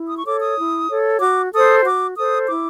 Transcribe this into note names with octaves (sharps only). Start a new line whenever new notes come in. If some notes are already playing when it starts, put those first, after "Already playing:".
Already playing: E4
D#6
C#6
A4 C#5 D6
D#6
E4
A4 C#5
F#4 D6
A4 C5 D#6
F#4 D6
A4 C5 D#6
E4 D6